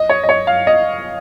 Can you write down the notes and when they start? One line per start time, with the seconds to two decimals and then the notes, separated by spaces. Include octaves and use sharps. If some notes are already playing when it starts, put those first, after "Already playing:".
Already playing: D#5
0.09 C#5
0.23 D#5
0.29 C#5
0.47 F5
0.67 D#5